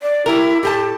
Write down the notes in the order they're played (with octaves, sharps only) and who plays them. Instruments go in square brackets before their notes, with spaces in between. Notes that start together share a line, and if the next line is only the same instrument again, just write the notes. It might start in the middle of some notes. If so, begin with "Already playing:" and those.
[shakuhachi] D5
[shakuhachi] E4 [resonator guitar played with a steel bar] G4 G#4 A#4
[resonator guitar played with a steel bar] A2 A4 A5 [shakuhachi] G4